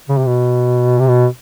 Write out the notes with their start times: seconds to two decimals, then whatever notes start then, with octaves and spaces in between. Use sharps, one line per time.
0.09 C#3
0.18 C3
0.26 B2
0.99 C3
1.07 B2